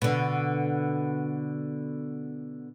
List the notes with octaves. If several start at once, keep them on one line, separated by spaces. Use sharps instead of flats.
B2 D3